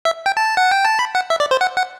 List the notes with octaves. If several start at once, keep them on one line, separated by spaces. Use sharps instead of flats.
E5
G5
A5
F#5
G5
A5
B5
F#5
E5
D5
C5
F#5
F#5